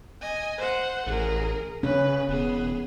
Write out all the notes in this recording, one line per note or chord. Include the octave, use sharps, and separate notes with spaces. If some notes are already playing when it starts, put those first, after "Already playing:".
D#5 G#5
C5 F#5
A1 G#4 A#4
C#3 C#4 B4
E1 B3 G#4